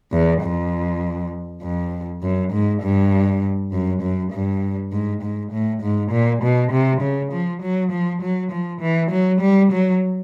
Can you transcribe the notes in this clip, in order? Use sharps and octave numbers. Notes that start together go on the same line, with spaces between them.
E2
F2
F2
F#2
G#2
G2
F#2
F#2
G2
G#2
G#2
A2
G#2
A#2
B2
C3
C#3
F3
F#3
F3
F#3
F3
E3
F#3
G3
F#3